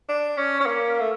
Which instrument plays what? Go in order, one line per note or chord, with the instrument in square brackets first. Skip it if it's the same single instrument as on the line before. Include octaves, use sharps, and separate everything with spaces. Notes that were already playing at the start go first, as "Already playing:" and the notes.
[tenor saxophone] D4
C#4
C#4
A#3
A3